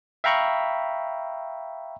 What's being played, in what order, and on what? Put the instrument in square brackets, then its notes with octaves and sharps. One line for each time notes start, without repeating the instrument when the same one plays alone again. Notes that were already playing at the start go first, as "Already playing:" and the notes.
[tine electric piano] E5 F5 G5 A#5 B5 C#6